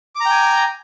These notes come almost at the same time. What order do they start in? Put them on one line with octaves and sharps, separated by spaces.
D6 A#5 G5 G#5